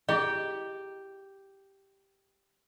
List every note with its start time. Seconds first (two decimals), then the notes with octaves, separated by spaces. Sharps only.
0.09 E4 G4 G#4 D#5